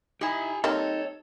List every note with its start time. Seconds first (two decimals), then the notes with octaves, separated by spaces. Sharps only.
0.21 D#4 E4 G4 G#5
0.64 G3 A#3 C4 D#4 A4 C#5